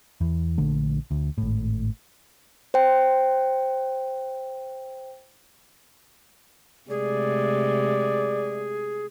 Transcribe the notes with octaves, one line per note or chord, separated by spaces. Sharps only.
E2
A#1 D3 A3
D2
G#1 A2
C5 G5
C3 G#3 A3 G#4 D5